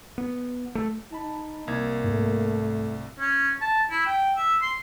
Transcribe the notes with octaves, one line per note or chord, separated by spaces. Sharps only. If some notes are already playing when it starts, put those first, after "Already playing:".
B3
A3
D#4 A5 B5
C2 A#3 G#6
G#2 A3
C#4
A5
E4
G5
E5
C6